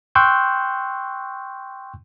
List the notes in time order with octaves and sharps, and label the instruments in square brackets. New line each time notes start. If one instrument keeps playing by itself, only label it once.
[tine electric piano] G5 C6 C#6 E6 F#6 G6